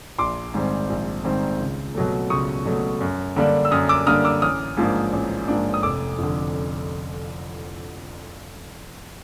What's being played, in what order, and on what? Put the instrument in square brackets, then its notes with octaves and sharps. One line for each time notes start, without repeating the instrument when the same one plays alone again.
[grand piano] A#1 C6 D6
G#2 D#3 G3 C4
A#1
G#2 D#3 G3 C4
C#2
B2 F#3 A3
C#2 C#6 D#6
B2 F#3 A3
F#2
D3 G3 A#3 D4
E6
F#2 D#6 F6
D6 E6
D3 G3 A#3 D4 D#6 F6
D6 E6
A1 D#6 F6
G#2 F3 A#3 D4
A1
G#2 F3 A#3 D4
D#6
F1 D6 E6
F2 D3